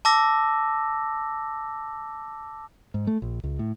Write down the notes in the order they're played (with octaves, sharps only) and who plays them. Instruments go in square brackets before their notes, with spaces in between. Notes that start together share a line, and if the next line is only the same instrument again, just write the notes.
[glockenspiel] A5 D6 E6 A#6
[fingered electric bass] G#2
A3
A#1
C#2
A2